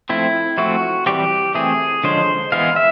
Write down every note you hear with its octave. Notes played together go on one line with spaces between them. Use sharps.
F3 A3 C4 E4
F3 A3 C4 F#4
E3 G3 C4 G4
E3 A3 C4 G#4
D3 F3 G#3 C#4 C5
E3 G#3 B3 F5
E5